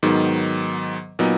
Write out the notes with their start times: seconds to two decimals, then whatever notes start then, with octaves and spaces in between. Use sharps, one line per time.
0.03 G#2 D#3 F#3 B3
1.19 A#2 F#3 B3 D#4